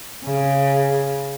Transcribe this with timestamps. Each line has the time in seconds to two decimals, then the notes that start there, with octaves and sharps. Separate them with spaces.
0.24 C#3